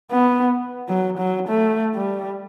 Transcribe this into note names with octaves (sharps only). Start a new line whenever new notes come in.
B3
F#3
F#3
A3
G3